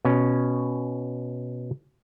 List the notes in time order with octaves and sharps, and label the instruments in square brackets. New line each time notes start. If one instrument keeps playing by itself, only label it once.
[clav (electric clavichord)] B2 C#4